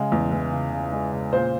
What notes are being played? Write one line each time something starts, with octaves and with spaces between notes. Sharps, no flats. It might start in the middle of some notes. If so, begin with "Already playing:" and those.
Already playing: C#3 G#3
E2
E3
C#3
C#3
G#3
C#3
A#2 C5